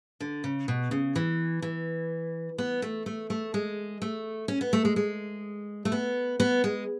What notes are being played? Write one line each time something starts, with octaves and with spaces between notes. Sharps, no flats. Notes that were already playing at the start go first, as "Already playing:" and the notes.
D3
C#3
B2
C#3
E3
E3
B3
A3
A3
A3
G#3
A3
C#4
B3
A3
G#3
G#3
A3
B3
B3
G#3